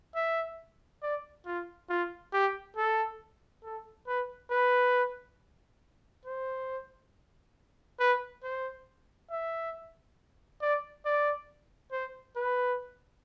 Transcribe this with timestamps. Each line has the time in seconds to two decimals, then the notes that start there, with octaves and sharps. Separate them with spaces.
0.15 E5
1.02 D5
1.46 F4
1.90 F4
2.33 G4
2.77 A4
3.64 A4
4.07 B4
4.51 B4
6.25 C5
8.00 B4
8.43 C5
9.31 E5
10.61 D5
11.05 D5
11.92 C5
12.36 B4